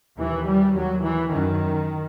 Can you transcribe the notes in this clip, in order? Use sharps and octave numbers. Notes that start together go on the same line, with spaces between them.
D#2 E3
G3
D#2 F#3
E3
F#2 D#3